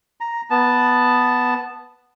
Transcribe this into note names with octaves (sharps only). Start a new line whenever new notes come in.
A#5
B3 A5